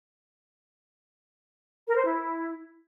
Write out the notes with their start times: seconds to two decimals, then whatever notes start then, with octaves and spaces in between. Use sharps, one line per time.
1.88 A#4
1.96 C5
2.04 E4